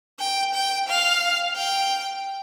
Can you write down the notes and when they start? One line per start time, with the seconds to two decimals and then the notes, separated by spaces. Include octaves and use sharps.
0.20 G5
0.54 G5
0.88 F5
1.56 G5